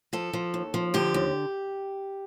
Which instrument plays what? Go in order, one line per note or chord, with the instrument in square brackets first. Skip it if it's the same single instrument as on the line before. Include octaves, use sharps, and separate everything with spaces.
[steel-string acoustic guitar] F3 A4
F3
D#2
F3
D3 G4
D#2